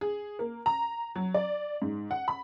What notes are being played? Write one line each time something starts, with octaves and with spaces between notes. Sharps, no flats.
G#4
A#3
A#5
F#3
D5
G#2
F#5
B5